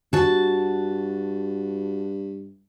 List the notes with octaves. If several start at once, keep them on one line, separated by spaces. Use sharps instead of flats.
G2 F#4 A5